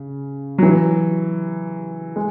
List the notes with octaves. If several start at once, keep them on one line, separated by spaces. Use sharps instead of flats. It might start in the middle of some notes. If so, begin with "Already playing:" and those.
Already playing: C#3
F#3
E3
G#3